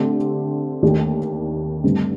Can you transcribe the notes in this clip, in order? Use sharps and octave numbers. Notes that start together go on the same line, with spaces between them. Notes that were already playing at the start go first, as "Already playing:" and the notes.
Already playing: D3 A3 C4 G4
D#2 D#3 A3 D4 G4
G2 D3 A3 C4